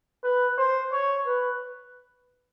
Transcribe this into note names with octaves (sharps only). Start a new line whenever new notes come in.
B4
C5
C#5
B4